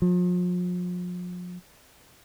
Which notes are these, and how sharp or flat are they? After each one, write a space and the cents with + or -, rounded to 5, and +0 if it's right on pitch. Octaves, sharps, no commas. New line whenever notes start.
F3 +40